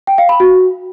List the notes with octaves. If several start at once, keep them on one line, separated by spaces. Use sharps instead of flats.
G5
F5
B5
F#4